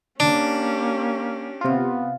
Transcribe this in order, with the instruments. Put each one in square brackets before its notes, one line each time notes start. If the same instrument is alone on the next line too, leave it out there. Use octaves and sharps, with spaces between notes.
[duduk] A#3 [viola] C#4 G4 [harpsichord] D4
[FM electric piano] C3 F4 [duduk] B3